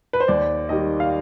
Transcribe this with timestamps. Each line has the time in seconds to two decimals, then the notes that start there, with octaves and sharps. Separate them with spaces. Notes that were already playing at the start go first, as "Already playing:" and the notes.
0.13 B4
0.20 C5
0.28 D#2 D5
0.69 D#3 G3 D#5
1.00 F5